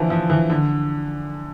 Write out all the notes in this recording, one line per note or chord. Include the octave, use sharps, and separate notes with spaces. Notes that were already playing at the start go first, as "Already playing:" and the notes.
Already playing: D3 E3 F3
F3
E3
D3